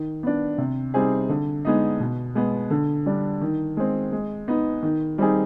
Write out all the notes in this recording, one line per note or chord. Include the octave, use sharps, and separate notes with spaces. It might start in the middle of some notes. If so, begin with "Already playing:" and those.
Already playing: D#3
B3 D4
C3
G3 C4 D#4 G#4
D3
G#3 B3 D#4
B2
G#3 B3
D3
G3 D4
D#3
G#3 C4
G#3
B3 D#4
D#3
G3 C4 D#4 G#4